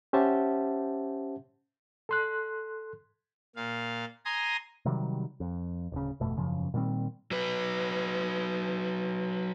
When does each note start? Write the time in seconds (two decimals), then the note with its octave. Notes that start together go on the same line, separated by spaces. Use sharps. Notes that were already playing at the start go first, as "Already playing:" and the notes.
0.13 C#4 G4 C5 E5 F#5 A5
2.09 A4 C6 F#6
3.56 A#2 F5
4.25 G#5 A#5 C6 D#6
4.85 C3 D#3 F#3 G3
5.40 F2
5.92 D1 C#3
6.20 G1 F2 B2 A3
6.36 E1 F#2 C#3 F3
6.74 A#2 D#3 G3 C4
7.31 F#3 B4